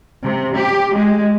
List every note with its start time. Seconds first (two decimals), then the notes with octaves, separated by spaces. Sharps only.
0.24 C3
0.54 G4
0.95 G#3